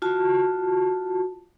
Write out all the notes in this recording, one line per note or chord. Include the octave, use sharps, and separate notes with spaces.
F4 F#4 A5